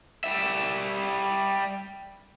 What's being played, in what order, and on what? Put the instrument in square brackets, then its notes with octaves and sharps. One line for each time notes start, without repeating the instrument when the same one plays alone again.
[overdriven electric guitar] G3 E5